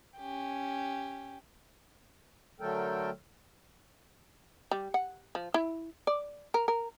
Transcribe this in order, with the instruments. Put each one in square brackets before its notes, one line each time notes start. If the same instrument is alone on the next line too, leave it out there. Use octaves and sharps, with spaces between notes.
[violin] C#4 G4
[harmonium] D3 F#3 A3 A4 A#4 G5
[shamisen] G3
F#5
F3
E4
D5
A#4
A#4